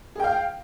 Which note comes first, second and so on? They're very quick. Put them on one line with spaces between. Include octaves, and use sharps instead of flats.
G#4 G5 F5